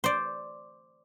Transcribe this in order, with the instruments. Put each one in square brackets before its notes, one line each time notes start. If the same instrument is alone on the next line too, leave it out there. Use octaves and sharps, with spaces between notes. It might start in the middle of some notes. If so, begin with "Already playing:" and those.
[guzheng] C5 D5